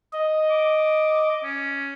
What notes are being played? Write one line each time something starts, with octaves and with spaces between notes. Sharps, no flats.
D#5
D6
C#4